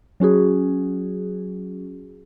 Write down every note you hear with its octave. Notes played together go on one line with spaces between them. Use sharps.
F#3 C#4 F#4 G#4